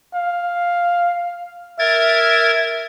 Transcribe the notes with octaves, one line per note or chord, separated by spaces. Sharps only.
F5
A#4 E5 G#6 A6